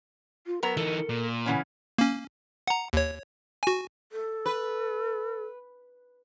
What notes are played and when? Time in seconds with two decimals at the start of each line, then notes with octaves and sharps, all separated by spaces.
0.46 F4
0.63 F#3 B3 A#4 A#5
0.77 E3 D#4 A4
1.09 A#2
1.46 C#3 E3 C#4 F#5
1.98 A#3 C#4
2.67 F#5 A#5
2.93 D#2 C#5
3.63 F#4 G#5
4.12 A4
4.46 B4